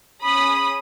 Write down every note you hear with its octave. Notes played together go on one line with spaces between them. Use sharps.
C#4 G#4 B5 D#6